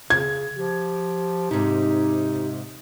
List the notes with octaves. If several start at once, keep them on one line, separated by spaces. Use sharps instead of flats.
C#3 G#6
F3 G4
G#2 C3 D#4